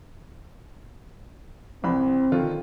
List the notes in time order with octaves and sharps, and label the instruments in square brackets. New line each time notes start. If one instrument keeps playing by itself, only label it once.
[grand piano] C2 E3 B5 [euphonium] C4
[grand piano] D3 D#3 F4